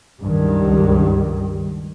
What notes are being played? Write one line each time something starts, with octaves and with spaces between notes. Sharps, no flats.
C#2 G2 D#3 G3